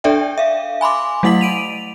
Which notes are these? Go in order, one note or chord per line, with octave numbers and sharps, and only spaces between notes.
D4 A4 D5 E5 G5
E5 F5
G#5 B5 C6 D6
F#3 A3 E4 F#5 B6 F#7
D7 D#7 F7